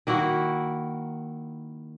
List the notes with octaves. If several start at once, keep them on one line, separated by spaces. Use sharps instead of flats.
D#3 A#3 E4 F#4